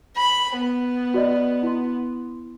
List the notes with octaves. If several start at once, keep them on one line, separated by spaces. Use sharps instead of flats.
B5
B3
F#4 D5 D#5
E4 C6